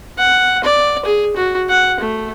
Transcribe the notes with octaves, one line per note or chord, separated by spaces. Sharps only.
F#5
D5
G#4
F#4
F#5
A3